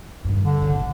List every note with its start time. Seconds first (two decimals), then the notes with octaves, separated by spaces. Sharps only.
0.25 G2 D#3
0.44 D3
0.62 C#3
0.75 A1 D3